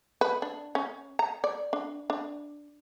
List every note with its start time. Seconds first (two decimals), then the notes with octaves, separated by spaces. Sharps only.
0.21 B4
0.42 D4
0.75 C#4
1.19 A#5
1.44 D5
1.73 D4
2.10 D4